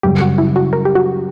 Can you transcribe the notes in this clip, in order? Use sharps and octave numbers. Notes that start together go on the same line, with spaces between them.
F#2 C#3 G3 G4
F#4
E4
F#4
A#4
G4
F#4